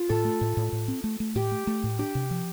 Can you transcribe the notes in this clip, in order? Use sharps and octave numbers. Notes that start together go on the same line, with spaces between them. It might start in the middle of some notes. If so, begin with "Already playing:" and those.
Already playing: F4
A2 A4
A3
A2
A2
A2
C4
A3
A3
A2 G4
A3
A3
A2
D4 G4
C3
F3